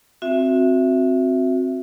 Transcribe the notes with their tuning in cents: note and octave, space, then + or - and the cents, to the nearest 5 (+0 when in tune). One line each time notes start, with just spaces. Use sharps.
C4 +5 F#4 -25 E5 +10